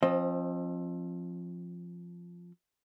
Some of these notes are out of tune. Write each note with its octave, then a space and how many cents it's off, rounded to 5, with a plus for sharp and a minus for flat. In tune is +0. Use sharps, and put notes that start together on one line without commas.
F3 +0 C4 +30 D#5 +0